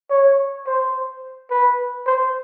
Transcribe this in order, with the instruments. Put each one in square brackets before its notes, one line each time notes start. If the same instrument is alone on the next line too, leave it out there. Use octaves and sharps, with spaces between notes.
[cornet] C#5
C5
B4
C5